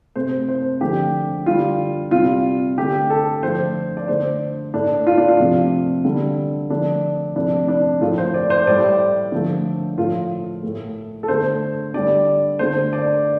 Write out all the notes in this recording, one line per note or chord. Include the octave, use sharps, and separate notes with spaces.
C3 A3 C5
C5
D3 F3 A3 G4
D3 G3 F4
C3 F4
G3
D3 A3 G4
A4
D3 F3 A3 C5
D5
D3 A3 C5
A2 A3 D4
F4
D4
F4
C3 F3 A3
D3 G3
D3 F3 A3 D4
C3 F3 A3 D4
D4
A2 F3 A3 F4
C5
D5
C5
A2 G3 D5
D3 F3 A3
A2 F3 A3 F4
A2 A3
A4
D3 A3 C5
D3 G3 D5
D3 A3 C5
D5